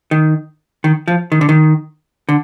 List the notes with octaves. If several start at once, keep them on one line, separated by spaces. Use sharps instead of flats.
D#3
D#3
F3
D#3
D3
D#3
D3